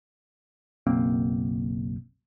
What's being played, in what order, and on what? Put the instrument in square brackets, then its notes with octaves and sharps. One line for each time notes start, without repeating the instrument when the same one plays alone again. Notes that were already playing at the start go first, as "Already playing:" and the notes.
[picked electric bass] F#1 B1 A#3 C4